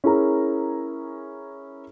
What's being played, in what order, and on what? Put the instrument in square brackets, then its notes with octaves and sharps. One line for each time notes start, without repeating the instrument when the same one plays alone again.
[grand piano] C#4 E4 G#4 A#4 A#5